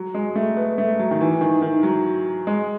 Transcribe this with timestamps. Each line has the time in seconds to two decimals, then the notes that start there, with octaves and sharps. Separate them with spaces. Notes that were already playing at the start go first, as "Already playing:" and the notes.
Already playing: F#3
0.14 G#3
0.36 A3
0.57 B3
0.78 A3
0.99 F#3
1.11 D#3
1.21 E3
1.41 D#3
1.62 D#3
1.83 F#3
2.47 G#3